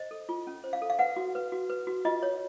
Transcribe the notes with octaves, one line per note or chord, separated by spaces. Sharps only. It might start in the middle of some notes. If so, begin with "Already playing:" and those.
Already playing: C5 D#5
A4
F4
C#4
C5
F5
A4
F5
B4 F#5
F#4
B4
F#4
B4
F#4
F4 D#5
C#5